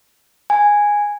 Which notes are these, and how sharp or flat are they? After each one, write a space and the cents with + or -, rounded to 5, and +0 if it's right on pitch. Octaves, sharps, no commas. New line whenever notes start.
G#5 -10